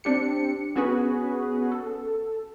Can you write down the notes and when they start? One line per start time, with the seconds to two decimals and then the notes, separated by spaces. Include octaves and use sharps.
0.04 C4 D4 G4 C#7
0.75 B3 C#4 F#4 G#4 B4
1.72 A4